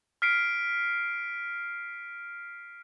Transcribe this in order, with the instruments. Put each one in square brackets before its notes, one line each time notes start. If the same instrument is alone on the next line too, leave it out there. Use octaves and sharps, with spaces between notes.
[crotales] F6 B6 C7 D7